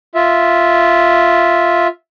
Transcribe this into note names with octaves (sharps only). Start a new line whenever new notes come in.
F4 E5